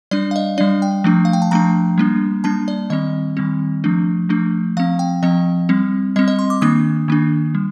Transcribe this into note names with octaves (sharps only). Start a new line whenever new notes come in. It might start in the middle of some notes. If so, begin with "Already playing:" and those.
G3 D4 D5
F5
D#5
G3 D4 D5
G5
F3 A3 D4
F5
G5
A5
F3 A3 D4 A#5
G3 A#3 D4
G3 A#3 D4 A5
D5
D#3 G3 C4 D#5
D#3 G3 C4
F3 A3 D4
F3 A3 D4
F3 C4 F5
G5
F3 C4 D#5
G3 C4
G3 C4 D#5
D#5
C6
D6
D#3 A#3 D4 D#6
D#3 A#3 D4
G3